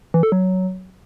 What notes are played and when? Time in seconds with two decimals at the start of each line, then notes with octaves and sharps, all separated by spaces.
0.14 E3
0.23 A4
0.32 F#3